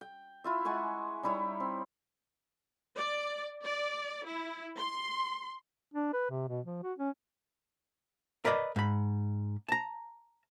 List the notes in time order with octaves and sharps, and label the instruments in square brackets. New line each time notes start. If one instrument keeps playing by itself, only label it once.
[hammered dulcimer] G5
E4 F4 E5
G#3 F#5 G#5 C#6
G3 D#4 E4 C#5
C4
[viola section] D5
D5
E4
C6
[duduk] D4
B4
C3
B2
F3
F#4
C#4
[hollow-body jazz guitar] A#4 B4 D5 D#5 B5
G#2 B5
A5 A#5